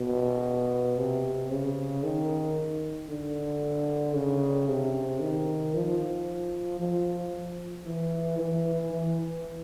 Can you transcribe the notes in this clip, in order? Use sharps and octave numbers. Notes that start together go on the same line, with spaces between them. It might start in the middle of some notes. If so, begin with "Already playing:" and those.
Already playing: B2
C3
C#3
D#3
D3
C#3
C3
D#3
F3
F3
E3
E3
E3